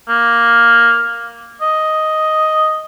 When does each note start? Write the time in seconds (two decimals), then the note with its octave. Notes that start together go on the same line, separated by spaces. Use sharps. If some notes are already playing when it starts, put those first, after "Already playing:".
0.09 A#3
1.62 D#5